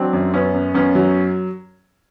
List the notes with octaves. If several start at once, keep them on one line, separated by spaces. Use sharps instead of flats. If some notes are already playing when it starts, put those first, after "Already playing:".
Already playing: F#3 C4 D4
F#2
F#2 B3 C#4
F#2
F#2 B3 C#4
F#3